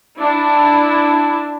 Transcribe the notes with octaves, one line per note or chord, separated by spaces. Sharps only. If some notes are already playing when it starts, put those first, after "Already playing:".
D4 E4